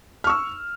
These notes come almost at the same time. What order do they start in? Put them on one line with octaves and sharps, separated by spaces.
F6 C#6 E6